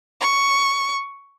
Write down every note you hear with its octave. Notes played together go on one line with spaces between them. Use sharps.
C#6